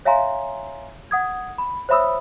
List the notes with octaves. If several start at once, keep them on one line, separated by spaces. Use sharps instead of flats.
C#5 E5 F5 G#5 A#5 C6
F#5 D#6 G#6
B5
C5 C#5 E5 B5 D#6 E6